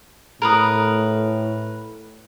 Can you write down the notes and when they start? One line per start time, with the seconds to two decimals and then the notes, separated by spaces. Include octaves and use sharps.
0.42 A2 A#4 B4 D#6